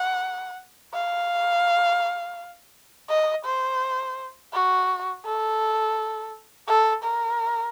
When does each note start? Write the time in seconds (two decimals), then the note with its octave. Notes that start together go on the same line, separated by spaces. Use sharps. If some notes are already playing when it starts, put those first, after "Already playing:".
Already playing: F#5
0.94 F5
3.09 D#5
3.45 C5
4.53 F#4
5.25 A4
6.68 A4
7.03 A#4